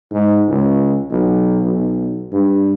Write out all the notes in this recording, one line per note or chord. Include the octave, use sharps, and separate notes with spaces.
G#2
C#2
B1
B1
G2